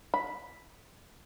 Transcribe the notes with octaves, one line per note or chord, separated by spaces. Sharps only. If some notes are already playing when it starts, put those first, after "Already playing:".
B5